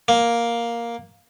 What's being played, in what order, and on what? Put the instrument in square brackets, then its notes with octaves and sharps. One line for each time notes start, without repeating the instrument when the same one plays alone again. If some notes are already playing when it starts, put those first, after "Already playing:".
[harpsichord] A#3